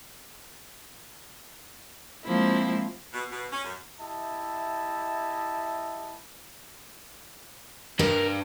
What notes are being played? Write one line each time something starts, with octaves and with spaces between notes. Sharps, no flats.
F3 G#3 A#3 C4 E4
B2
B2
C#4
F#2
E4 G4 D#5 E5 A5
G2 A#4